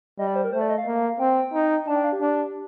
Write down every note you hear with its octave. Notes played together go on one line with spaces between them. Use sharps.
G3 D#5
D5
C5
A#4
A3 C5
D5
D#5
F5
A#3
F5
C4 G5
D#4
D4 A5
G5
F5
G4
D4